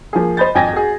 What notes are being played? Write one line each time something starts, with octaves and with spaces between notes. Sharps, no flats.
F3 A#3 G#4
C5 D#5 B5 G6 A6
G#1 F2 G5 G#5 G#6 A#6
F#4 G#4